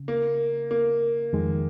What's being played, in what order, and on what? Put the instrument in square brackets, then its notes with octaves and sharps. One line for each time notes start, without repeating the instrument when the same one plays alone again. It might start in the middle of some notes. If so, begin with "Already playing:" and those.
Already playing: [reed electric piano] C#3
[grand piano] A#3
A#3
[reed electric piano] F2 D#3 G#3